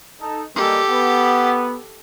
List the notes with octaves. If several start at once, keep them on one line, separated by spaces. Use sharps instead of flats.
D#4 A4
G3 G#3 A#3 G4 A4
B3